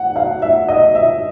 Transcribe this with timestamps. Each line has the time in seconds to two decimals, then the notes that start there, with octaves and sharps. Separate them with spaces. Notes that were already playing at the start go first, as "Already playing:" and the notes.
Already playing: F#5
0.16 F5
0.42 E5
0.68 D#5
0.95 E5